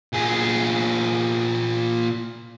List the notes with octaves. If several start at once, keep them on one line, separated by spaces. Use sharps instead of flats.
A#2 G#4